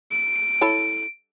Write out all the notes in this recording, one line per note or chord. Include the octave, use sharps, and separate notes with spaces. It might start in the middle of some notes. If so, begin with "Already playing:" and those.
D7
E4 A4 C#5